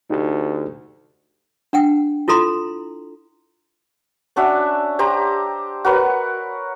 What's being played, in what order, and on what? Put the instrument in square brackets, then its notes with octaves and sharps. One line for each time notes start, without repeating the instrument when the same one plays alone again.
[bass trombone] D2 [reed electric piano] D#4 G4
[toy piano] D4 F#5 G5
E4 F4 A4 A#5 C6
[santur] C#4 D4 F#4 E5
G4 C5 A#5
F#4 A#4 B4 C#5